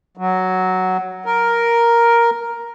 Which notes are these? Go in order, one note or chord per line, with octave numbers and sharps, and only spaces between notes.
F#3
A#4